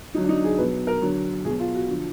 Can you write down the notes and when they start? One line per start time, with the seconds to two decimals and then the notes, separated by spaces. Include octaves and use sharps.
0.14 D3 F#3 D#4
0.24 D4
0.29 D#4
0.44 G#4
0.58 B2 F#3 B4
0.87 A#4
1.02 D3 F#3
1.45 B2 G#4
1.48 F#3
1.59 F4
1.74 F#4
1.88 D3 F3